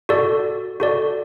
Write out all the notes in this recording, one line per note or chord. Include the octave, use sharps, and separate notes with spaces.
F#4 A4 D5
F#4 A4 D5